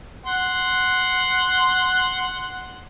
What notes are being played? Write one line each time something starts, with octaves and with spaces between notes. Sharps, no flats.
F#5 C6